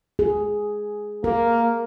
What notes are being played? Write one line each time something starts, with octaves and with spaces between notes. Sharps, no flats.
G#4
A#3 A#4